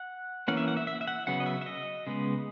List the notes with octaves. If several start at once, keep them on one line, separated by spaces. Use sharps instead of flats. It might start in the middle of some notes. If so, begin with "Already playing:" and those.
Already playing: F#5
E3 A#3 C#4 F#5
E5
F#5
E5
E5
E5
F#5
C#3 F#3 B3 F#5
D#5
E5
E5
D#5
C#3 G#3 B3